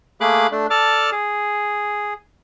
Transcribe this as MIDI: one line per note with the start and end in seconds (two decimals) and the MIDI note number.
0.21 0.47 57
0.21 0.47 58
0.21 0.47 68
0.21 0.47 83
0.21 0.47 86
0.21 0.47 90
0.52 0.67 57
0.52 0.67 62
0.70 1.10 69
0.70 1.10 74
0.70 1.10 81
0.70 1.10 86
0.70 1.10 89
1.12 2.14 68